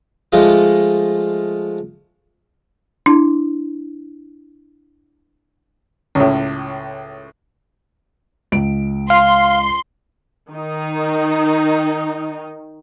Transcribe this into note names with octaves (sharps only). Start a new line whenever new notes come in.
F3 G#3 A3 F4 D#5
D4 E4
C#2 A2
C#2 D7
F5 C6
D#3 D#4